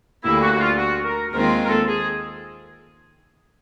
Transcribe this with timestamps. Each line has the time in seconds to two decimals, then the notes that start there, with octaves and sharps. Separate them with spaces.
0.23 D2 D3 G3 A#3 E4
0.42 F#4
0.52 F#4
0.59 F4
0.78 F#4
1.05 A#4
1.33 D#2 D#3 G#3 C4 F4 A#4
1.63 A#4
1.68 A4
1.87 G#4